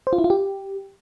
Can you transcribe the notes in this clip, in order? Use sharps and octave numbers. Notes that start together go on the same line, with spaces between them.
C5
F4
E4
F4
G4